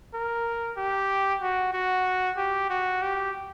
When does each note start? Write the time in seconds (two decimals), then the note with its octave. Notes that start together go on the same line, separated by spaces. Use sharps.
0.14 A#4
0.77 G4
1.42 F#4
1.73 F#4
2.37 G4
2.70 F#4
3.02 G4